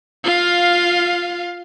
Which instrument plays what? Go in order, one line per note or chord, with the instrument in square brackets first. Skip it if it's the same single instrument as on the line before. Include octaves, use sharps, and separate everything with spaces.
[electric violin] F4 F5